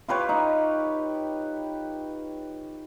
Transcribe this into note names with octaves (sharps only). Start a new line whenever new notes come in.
F4 G4 B4 C#5
D#4